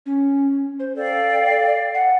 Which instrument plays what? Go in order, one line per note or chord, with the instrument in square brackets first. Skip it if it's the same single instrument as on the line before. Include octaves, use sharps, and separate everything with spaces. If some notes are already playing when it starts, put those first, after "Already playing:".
[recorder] C#4
C5
[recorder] A4 [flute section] D5 F5 G5
[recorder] F#5